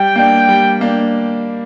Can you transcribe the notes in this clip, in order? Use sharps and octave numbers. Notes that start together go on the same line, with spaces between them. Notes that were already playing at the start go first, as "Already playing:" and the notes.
Already playing: G3 G5
A#3 D4
G3
A#3 D4